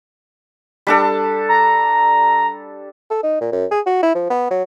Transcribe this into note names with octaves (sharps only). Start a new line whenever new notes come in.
G3 D4 A4
A#5
A4
D#4
A#2
F#2
G#4
F#4
E4
F3
B3
F#3